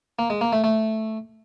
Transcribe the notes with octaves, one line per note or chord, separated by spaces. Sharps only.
A#3
G#3
A#3
A3
A3